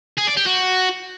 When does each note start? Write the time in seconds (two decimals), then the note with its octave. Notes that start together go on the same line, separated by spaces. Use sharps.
0.18 G#4
0.27 D5
0.37 G4
0.46 F#4